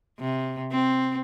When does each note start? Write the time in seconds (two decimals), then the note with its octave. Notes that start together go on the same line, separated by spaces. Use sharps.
0.19 C3
0.71 C4